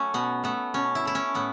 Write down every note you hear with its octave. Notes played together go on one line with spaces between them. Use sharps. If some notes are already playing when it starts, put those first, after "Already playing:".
Already playing: F#3 A3 C#4
B2 B3
A3 B3
B2 C#4
E4
A3 E4
C#4
A2 B3